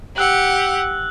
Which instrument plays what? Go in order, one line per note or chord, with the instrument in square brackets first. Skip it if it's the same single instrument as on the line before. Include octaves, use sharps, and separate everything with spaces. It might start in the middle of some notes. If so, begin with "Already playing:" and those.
[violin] G4 F#5 [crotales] E6 F#6 F#7